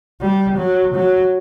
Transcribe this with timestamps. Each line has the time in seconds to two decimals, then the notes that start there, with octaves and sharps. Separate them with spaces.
0.21 G3
0.57 F#3
0.94 F#3